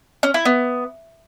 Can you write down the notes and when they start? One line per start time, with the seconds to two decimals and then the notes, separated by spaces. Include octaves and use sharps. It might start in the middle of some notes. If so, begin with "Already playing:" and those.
0.23 C#4
0.34 E4
0.45 B3